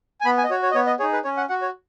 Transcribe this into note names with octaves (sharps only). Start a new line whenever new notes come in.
G#5
B3 B5
G#5
D#5
F#4 C#5
C#5
D#5
B3 C#5
D#5
D#4 G#4 C#5
B4
C#4 C#5
F#5
F#4 F#5
C#5